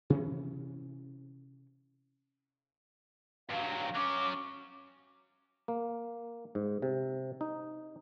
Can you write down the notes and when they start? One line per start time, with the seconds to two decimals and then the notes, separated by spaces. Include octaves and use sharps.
0.10 C3 E3 C#4
3.49 G2 F#3 F5
3.95 F#3 C#4 D6
5.68 A#3
6.55 G#2
6.82 C3
7.41 D#4